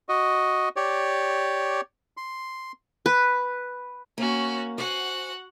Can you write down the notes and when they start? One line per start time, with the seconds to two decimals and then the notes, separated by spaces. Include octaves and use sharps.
0.09 F#4 D#5
0.76 G4 C#5 D5
2.17 C6
3.06 B4
4.18 A#3 C#4 F#4
4.78 F#4 C5 F#5 G#5